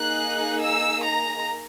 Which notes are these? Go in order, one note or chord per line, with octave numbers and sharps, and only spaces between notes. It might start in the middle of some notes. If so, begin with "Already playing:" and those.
Already playing: A#3 D#4 G#4 F#6
E6
A#5